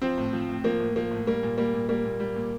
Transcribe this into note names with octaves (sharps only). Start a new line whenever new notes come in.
F3 C4
A2
F3
A2
F3 A#3
A2
F3 A#3
A2
G3 A#3
A#2
G3 A#3
A#2
G3 A#3
A#2
G3
A#2